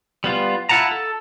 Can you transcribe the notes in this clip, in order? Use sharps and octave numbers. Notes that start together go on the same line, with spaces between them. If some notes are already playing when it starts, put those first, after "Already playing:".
G3 B3 F4
E4 F4 F#5 A5 A#5
A4